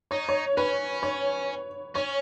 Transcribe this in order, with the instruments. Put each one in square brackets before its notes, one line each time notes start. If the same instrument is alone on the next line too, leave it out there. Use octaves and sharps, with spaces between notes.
[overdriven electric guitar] D#4 [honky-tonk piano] C#5
[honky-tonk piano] C#5
[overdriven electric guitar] C#4 [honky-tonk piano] B4
[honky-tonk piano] C#5
[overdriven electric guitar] C#4 [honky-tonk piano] C#5